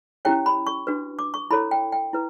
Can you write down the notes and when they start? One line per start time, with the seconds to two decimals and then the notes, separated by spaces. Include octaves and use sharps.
0.25 C#4 E4 G4 C#5 G5
0.46 B5
0.66 C#6
0.87 D4 F#4 B4
1.19 D6
1.34 C#6
1.50 E4 A4 C#5 B5
1.71 G5
1.92 G5
2.13 E4 B4